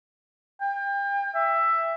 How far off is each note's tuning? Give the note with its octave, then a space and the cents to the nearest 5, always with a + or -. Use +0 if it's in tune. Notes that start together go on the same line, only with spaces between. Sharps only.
G5 +35
E5 +10